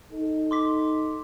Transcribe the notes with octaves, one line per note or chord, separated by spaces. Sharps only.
D#4 A4
C6 D6 B6